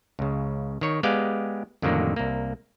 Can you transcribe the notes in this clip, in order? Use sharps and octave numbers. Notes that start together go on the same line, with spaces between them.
C#2 C#3
D#3 C#5
G#3 B3 G4 D5 F5 G5
F2 A2 D3 D#3 F#3 A#3
C2 A#3